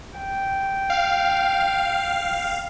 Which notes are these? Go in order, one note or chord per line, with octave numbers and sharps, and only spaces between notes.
G5
F5